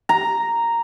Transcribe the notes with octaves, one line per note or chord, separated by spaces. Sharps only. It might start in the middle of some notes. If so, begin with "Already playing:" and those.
A#5